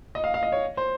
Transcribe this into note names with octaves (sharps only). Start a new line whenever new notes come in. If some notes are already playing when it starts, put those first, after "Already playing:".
D#5
F5
F5
D#5
C#5
C5